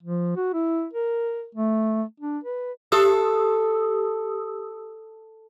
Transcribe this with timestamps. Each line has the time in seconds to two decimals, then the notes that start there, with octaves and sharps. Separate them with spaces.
0.03 F3
0.36 F#4
0.54 E4
0.93 A#4
1.55 A3
2.20 D4
2.44 B4
2.92 G4 A4 D#6 E6